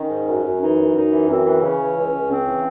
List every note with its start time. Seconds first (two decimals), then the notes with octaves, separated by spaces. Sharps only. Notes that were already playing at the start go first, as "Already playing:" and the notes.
Already playing: D#3 C#4
0.10 G#2
0.27 F#2
0.44 F#2
0.60 E3 D#4
0.78 F#2
0.95 F#2 D#4
1.11 E3
1.28 F#2 C4
1.45 E3
1.62 C#3 C#4
1.80 E3
1.96 C#2
2.13 C#2
2.30 C#3 C4
2.46 E3